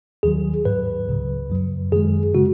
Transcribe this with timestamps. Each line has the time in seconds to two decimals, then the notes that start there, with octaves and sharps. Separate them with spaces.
0.23 D#2 D#3 F#3 G#4
0.65 G#2 F#3 B4
1.08 C#2 C#3 F#3
1.50 F#2 F#3
1.92 F#2 D#3 G#3 G#4
2.35 C#3 G#3 F#4